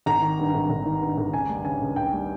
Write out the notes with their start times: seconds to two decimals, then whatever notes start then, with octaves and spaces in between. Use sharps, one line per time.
0.06 G#1 A#5
0.22 D#3
0.39 G2
0.54 G#1
0.70 G#1
0.86 D#3
1.01 G2
1.17 G#1
1.33 C#2 G#5
1.49 G3
1.65 C#3 G#5
1.81 C#2
1.96 C#2 G5
2.13 G3